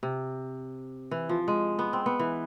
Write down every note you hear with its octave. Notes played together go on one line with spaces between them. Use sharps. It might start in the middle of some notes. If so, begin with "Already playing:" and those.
C3
E3
F3
G#3
B3
C4
B3
E3